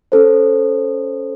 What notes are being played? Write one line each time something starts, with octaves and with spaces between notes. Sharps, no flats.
C#4 A4 C5